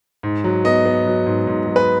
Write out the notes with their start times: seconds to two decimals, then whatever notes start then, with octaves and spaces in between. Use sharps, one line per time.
0.23 G#2
0.44 F#3
0.65 B3 D#5
0.85 B3
1.06 F#3
1.26 G#2
1.47 G#2
1.67 F#3
1.76 B4